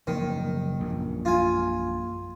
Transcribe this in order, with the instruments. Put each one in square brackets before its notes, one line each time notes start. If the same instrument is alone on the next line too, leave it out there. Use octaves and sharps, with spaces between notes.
[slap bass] F#1 F3 A#3 [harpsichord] D#3
[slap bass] A#1 F#2
[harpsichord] F4 G#5